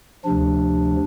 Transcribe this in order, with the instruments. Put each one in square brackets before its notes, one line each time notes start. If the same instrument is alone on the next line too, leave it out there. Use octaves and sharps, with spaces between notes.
[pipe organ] D2 C3 F3 D4